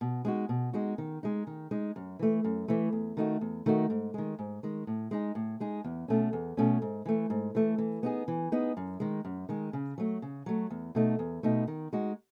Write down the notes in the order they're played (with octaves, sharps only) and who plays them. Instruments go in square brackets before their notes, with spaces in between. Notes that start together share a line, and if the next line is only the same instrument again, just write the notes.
[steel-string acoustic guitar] B2
G#3 D#4 F#4
B2
G#3 D#4 F#4
D#3
G#3 D#4
D#3
G#3 D#4
F#2
E3 A3
F#2
E3 A3
E2
D#3 A3 D#4 F#4
E2
D#3 A3 D#4 F#4
G#2
D#3 G#3
G#2
D#3 G#3
A2
G#3 D#4 G#4
A2
G#3 D#4 G#4
E2
B2 A3 C#4
E2
B2 A3 C#4
G#2
E3 A3
G#2
E3 A3
E3
B3 D#4 G#4
E3
B3 D#4 G#4
F#2
D#3 G#3
F#2
D#3 G#3
C#3
F#3 A3
C#3
F#3 A3
E2
B2 A3 D#4
E2
B2 A3 D#4
D#3
G#3 D#4 F#4